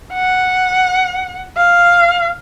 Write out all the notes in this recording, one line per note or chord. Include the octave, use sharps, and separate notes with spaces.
F#5
F5